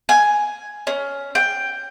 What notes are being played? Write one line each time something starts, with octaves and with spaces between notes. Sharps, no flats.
G#5
C#4
G5